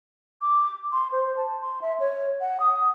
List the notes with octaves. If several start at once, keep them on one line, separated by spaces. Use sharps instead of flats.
D6
C6
C5
A5
C6
E5
C#5
F#5
D#6